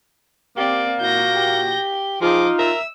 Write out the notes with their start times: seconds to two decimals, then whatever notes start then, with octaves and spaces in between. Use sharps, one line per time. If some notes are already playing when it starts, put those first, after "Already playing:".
0.57 A#3 C4 G4 D5
1.01 A#2 E4 F#4 G6 A#6
1.35 G4
2.22 F3 D#4 F4 G#4 D#5 D6
2.59 A#4 E5 E6